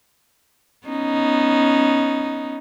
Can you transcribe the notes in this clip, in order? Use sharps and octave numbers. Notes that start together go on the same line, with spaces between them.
B3 C#4 D#4